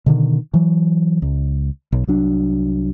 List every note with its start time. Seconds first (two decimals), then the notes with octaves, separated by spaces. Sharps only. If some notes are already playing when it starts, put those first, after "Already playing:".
0.06 B2 D3 D#3
0.53 E3 F#3
1.22 C#2
1.92 B1
2.07 C2 F#3 D4